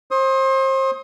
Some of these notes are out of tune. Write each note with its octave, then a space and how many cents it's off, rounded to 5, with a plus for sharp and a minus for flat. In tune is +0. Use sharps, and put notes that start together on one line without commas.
C5 +30 D#6 +25